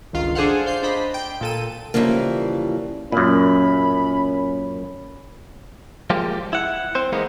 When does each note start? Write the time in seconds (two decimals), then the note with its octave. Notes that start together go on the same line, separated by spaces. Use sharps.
0.13 G1 C#2 D#3 F4 F5
0.35 D4 G#4 A4 C5 F5 F#5
0.66 C5 F5 G6
0.83 D4 C5 D#5 B5
1.14 G5
1.41 A#2 A4 D#7
1.94 C#3 E3 F3 G3 A#3
3.12 F#2 A#2 C#4 B5
6.10 F3 G#3 A#3 G4
6.53 E4 F#5
6.95 C4 C5
7.12 E3 G#3 A#3 B3 D#4